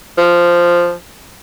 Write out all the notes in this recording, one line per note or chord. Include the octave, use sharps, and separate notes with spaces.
F3